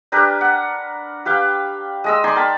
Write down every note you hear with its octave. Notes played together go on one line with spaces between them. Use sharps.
D4 G4 A#4 B4
F#5
G4 B4 F5 G5
G#3 D#5 E6
D#4 D5 G#5 C6
A#4 G5 A5 B5